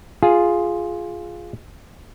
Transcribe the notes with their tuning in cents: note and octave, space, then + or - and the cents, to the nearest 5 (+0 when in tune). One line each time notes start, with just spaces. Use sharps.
F4 +0 G#4 +0